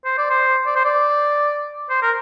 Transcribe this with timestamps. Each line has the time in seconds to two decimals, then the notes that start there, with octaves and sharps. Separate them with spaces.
0.05 C5
0.18 D5
0.30 C5
0.67 D5
0.76 C5
0.85 D5
1.90 C5
2.02 A#4